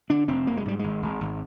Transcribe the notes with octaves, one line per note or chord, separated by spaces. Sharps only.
D3 D4
F1 C4
F1 A#3
G#3
G#2 G3
G#1 G#3
G#1
G#1